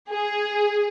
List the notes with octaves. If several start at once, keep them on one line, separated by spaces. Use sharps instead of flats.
G#4